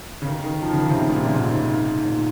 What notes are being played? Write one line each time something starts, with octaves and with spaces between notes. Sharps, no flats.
C#3
D#3
D#3
F3
C#3
D#3
C3
C#3
A#2
C3
A#2
G#2
A#2